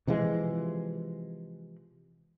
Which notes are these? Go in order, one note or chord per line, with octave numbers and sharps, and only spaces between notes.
C3 E3 F3 G#3